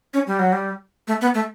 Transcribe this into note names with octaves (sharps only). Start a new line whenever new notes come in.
C#4
G3
F#3
G3
A3
B3
A3